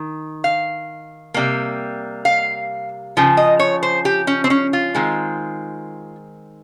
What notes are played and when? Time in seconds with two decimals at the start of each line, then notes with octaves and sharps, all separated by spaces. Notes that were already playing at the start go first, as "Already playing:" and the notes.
Already playing: D#3
0.44 F5
1.34 C3 G3 A#3
2.25 F5
3.17 C#3 F3
3.37 D#5
3.59 C#5
3.83 C5
4.05 G4
4.27 C#4
4.44 C4
4.50 C#4
4.73 F4
4.95 D#3 G#3 C4